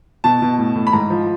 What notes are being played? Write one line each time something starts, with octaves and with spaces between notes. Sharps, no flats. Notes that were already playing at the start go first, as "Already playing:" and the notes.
B2 A5
B2
A2
A2
B5
G#2 A#5
F3